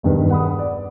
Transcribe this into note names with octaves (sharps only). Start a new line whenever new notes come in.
E1 G2 D#3 B4
F#5 B5 D#6
D5